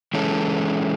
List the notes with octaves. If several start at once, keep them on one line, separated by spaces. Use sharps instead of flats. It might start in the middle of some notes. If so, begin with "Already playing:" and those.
E3 G#3 C#4 E4 A4